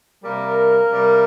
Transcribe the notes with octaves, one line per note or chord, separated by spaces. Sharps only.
C3 G3 A#3 A#4
C3 G3